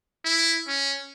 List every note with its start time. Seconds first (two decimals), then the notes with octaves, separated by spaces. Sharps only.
0.25 E4
0.68 C#4